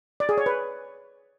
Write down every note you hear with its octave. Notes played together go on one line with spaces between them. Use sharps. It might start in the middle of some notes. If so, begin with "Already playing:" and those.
D5
G#4
C#5
B4